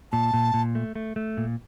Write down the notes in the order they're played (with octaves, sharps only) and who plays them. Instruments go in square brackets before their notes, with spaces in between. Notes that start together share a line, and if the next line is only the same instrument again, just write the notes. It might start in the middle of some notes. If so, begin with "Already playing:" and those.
[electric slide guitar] A#2 [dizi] A5
[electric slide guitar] A#2
A#2
A3
A3
A3
A#2